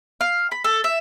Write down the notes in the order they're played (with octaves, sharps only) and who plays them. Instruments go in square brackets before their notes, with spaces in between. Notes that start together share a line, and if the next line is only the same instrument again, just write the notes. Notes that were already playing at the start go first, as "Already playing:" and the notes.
[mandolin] F5
B5
A4
E5